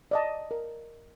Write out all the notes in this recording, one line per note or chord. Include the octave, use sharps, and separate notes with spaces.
D5 D#5 A5
A#4